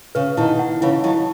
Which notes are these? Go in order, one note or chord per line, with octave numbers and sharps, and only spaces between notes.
C#3 B4
B2 D#3 E4
F#5
C#3 E3 E4
D#3 F#3 E4